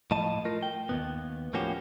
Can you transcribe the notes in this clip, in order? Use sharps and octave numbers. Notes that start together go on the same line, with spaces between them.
A2 F3 D#5 A5
A3 F4 A#4
G5
D#2 C3 B3
A2 F3 A#3 C#4 F#4 G4